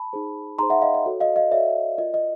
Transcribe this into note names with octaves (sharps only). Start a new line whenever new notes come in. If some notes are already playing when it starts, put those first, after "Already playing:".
Already playing: A5 B5
D#4 G#4 C5
D#4 G#4 C5 A#5 C6
E5 F#5
D#5 F5
D#5
F#4 A4 C#5
D#5 F5
D#5 F5
F#4 A4 C#5 D5 E5
F4 A#4 D5 D#5
D#5